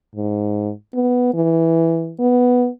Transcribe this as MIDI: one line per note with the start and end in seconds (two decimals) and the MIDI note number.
0.16 0.72 44
0.94 1.33 59
1.34 2.14 52
2.20 2.68 59